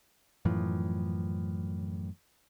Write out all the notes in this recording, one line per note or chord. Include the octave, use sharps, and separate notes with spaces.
F#2 A2 E3 F3